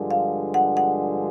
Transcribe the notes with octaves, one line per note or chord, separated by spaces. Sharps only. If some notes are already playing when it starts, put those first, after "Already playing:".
Already playing: G2 D3 F3 G#3
F5
F#5
F#5